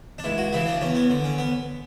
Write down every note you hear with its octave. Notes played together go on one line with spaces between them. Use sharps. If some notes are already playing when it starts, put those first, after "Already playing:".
D4
C#2 E4
F#4
C#3 E3 E4
D4
E2 C#4
B3
D3
C#4
B3